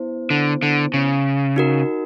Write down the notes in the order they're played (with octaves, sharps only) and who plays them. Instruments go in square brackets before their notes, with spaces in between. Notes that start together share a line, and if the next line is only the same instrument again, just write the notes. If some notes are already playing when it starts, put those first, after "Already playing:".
Already playing: [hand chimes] B3 E4 C5
[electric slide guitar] D3
D3
C#3
[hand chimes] D#4 F#4 A#4